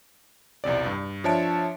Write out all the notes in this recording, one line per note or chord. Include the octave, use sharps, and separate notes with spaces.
B1 E2 C3 D5
G2
F3 D4 C#5 E5 A5 D7